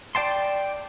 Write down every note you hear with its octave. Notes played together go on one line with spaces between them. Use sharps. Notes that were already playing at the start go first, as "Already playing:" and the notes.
D5 G5 A5 C6